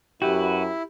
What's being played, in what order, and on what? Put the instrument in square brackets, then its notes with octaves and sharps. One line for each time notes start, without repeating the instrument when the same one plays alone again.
[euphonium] F#2 [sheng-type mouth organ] E4 [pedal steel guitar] F#4 B4 [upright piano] G4